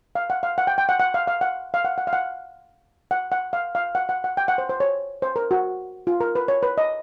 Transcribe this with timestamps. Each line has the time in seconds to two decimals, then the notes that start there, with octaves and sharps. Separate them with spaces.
0.15 F5
0.30 F#5
0.43 F5
0.58 F#5
0.67 G5
0.78 G5
0.89 F#5
1.00 F#5
1.14 F5
1.28 F5
1.41 F#5
1.74 F5
1.85 F#5
1.98 F#5
2.07 F5
2.13 F#5
3.11 F#5
3.32 F#5
3.53 F5
3.75 F5
3.95 F#5
4.09 F#5
4.24 F#5
4.37 G5
4.48 F#5
4.58 C5
4.69 C5
4.80 C#5
5.22 C5
5.36 A#4
5.51 F#4
6.07 F4
6.20 A#4
6.35 B4
6.48 C#5
6.63 B4
6.78 D#5